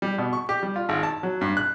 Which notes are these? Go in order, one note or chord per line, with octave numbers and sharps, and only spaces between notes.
G3
B2
C#6
G4
G3
F4
G#1
A5
F#3
G2
F#6